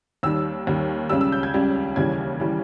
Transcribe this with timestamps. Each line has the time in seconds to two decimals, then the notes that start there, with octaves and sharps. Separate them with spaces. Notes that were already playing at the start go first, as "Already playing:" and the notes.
0.23 D#2 D#3 G3 E6
0.67 D#2 D#3 G3
1.09 C#2 C#3 G3 E6
1.21 E6
1.32 G6
1.43 G#6
1.54 C#2 C#3 G3
1.96 D#2 C#3 E3 G3 G#6
2.40 C#3 E3 G3